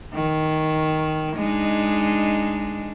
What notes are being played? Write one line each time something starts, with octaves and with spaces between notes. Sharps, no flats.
D#3
G#3 D4 D#4